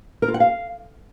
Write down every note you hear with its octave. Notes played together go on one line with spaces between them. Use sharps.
A#4
F4
F#5
F5